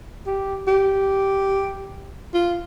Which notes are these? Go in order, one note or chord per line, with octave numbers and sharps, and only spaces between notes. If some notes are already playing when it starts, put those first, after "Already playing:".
G4
G4
F4